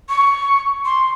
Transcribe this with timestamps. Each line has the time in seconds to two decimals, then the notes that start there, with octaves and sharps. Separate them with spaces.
0.09 C#6
0.85 C6